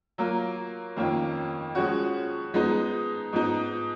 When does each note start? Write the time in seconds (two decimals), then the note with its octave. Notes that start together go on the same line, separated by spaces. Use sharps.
0.18 F#3 A#3 F4 A#4
0.97 F2 D#3 A#3 C#4 F4
1.75 F3 G#3 C#4 F#4
2.54 F3 G#3 B3 D#4
3.33 G#2 F3 B3 D#4